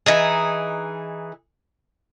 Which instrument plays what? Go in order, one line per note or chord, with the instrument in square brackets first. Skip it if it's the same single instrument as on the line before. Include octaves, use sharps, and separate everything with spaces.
[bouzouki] E3 D#4 G#4